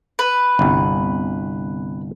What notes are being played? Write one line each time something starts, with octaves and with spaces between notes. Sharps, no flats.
B4
G1 C2